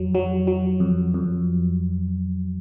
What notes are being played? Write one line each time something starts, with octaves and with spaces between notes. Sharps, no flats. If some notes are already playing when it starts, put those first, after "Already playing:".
Already playing: F2 F#3
F#3
F#3
F2
F2